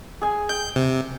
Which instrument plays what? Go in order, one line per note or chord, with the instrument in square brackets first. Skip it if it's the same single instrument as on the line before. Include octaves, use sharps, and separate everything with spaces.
[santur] G#4 G#5
[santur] G5 [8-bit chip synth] G6
[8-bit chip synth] C3